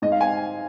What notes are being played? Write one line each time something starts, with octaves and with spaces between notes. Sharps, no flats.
G#2 D#5
F5
C4 G#5